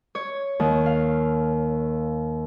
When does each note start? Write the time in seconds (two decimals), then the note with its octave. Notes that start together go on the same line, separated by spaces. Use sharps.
0.15 C#5
0.60 D#2
0.86 F5